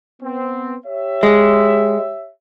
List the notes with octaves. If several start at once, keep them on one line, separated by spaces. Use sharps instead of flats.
B3 C4
G4 C#5 E5
G#3